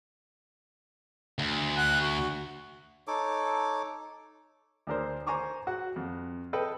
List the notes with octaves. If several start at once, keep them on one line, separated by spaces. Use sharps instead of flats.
D2
F#5
F#4
D#4 A4 C#5 D6
D2 D4 A#4 C5
C5 G#5 A#5 C#6 D6
F#4 F#5
F2
A4 B4 D#5 G5